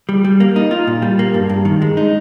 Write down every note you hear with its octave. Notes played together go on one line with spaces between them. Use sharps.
G3
G3
A#3
D#4
F4
A#2
G3
A#3
G2
G2
D#3
G#3
D#4